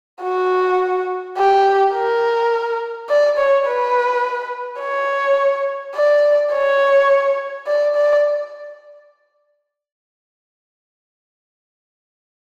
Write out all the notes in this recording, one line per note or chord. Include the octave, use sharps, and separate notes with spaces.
F#4
G4
A#4
D5
C#5
B4
C#5
D5
C#5
D5
D5